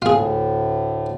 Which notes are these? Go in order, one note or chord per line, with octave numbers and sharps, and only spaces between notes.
D2 A2 F4 G#4